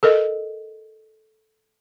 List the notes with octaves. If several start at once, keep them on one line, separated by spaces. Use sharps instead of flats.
A4 A#4 D#5